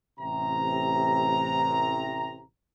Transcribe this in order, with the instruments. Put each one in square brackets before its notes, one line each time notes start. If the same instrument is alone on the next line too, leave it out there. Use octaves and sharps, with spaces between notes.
[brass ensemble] A1 C3 A#5